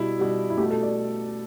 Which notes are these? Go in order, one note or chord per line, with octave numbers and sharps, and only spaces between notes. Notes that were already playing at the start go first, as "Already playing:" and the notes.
Already playing: B2 G3 E4
B2 G3
E4
A3 G4
B2
A4
D5